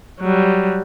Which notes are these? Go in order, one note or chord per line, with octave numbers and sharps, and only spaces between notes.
F#3 G3